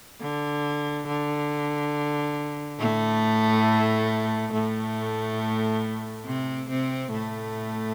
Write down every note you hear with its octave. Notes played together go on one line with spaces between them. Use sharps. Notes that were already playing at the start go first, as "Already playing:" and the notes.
D3
D3
A2 A3
A2 A3
C3 C4
C3 C4
A2 A3